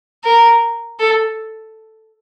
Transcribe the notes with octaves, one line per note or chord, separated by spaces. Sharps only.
A#4
A4